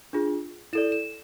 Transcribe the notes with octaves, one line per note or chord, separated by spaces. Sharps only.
D4 F4 G#4
E4 A4 D5 E7
E7